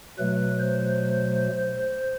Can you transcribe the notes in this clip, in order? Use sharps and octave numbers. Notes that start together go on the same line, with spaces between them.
B2 F#3 A3 B4
C5